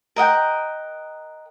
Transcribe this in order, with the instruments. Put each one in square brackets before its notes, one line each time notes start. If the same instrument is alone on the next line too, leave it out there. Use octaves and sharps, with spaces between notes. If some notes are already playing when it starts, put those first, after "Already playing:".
[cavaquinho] A#4 D#5 F#5 G5